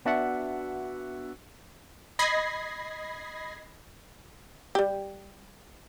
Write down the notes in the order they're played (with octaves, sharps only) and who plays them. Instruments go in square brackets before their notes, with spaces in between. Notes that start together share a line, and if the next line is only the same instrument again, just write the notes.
[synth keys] B3 D4 F#4 D5 E5 F#5
[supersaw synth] D#5 B5 G#6 A#6 C7
[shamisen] G3 G4